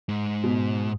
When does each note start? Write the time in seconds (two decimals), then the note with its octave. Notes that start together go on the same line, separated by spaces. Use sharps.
0.09 G#2
0.44 B2